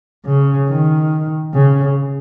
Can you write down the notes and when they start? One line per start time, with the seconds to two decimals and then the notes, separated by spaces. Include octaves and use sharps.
0.26 C#3
0.69 D#3
1.54 C#3